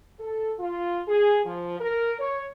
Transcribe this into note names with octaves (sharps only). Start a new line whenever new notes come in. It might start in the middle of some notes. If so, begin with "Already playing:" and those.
A4
F4
G#4
F3
A#4
C#5